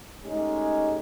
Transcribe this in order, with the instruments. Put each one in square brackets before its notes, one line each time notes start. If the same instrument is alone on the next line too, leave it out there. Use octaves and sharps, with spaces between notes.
[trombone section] G#3 A3 C#4 D#4 G4